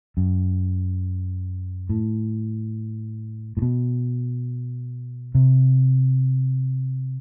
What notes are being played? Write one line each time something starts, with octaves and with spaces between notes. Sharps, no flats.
F#2
A2
A2
B2
C3